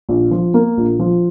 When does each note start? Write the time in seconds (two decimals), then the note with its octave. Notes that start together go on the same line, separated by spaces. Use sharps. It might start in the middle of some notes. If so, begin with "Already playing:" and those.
0.09 A#1
0.31 F3
0.54 A#3
0.77 A#1
0.99 F3